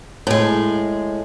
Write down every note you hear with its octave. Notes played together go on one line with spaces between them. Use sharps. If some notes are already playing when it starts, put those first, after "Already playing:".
A2 G#3